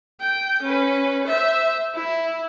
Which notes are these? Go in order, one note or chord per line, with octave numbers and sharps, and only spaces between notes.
G5
C#4 B4
C5 E5
E4